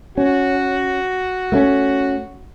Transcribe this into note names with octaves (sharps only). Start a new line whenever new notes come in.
C#4 F#4
A3 A#3 C#4